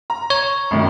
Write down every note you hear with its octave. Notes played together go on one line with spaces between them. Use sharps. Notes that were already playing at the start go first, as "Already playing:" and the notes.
A#5
C#5
G#1 F#2 D#3